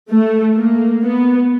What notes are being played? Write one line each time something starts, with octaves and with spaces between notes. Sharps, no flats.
A3
A#3
B3